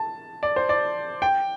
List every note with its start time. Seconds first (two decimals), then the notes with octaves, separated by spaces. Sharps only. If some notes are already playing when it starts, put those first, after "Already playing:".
Already playing: A5
0.43 D5
0.56 C5
0.69 D5
1.22 G5